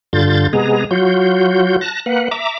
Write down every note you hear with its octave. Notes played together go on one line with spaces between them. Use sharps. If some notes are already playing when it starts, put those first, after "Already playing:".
G2 D3 F4 G6 A6
C3 G#3 B3 G#4 A#5
F#3 F4 F#4 G6
A5 F#6 A#6
A#3 B4 F#5
E5 A#5 D6